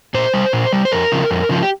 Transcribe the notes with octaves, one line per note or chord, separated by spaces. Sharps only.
A#2 C5
G3
A#2
G3
C5
F2 A#4
C#3 F3
F2
C#3 F3
G4